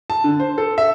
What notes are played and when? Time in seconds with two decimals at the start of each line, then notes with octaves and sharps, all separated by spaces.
0.10 A5
0.24 D3
0.40 C5
0.58 A4
0.78 E5